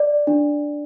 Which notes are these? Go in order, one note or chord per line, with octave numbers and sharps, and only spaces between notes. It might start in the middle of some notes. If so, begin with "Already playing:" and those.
Already playing: D5
D4